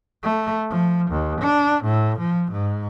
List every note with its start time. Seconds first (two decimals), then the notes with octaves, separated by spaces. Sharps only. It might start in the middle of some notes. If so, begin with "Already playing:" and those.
0.23 A3
0.70 F3
1.11 D#2
1.41 D4
1.84 A2
2.19 F3
2.52 G#2